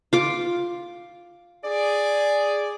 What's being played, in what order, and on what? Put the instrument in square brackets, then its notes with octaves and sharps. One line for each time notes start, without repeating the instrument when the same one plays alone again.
[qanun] F4 D6
[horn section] G#4 D5